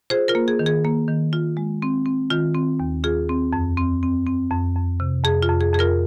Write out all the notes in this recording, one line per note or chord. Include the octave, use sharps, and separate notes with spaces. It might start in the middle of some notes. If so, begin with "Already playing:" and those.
F4 G#4 C5
F4 A#4
A#3
G#4
D#3
G#4
A#3
D#3
F4
G#3
C4
C4
D#3 F4
C4
D#2
F4 G#4
C4
F2
C4
C4
C4
F2
F2
C3
F2 G#4
F4
F2
G#4
F2 G#4
F4 A#4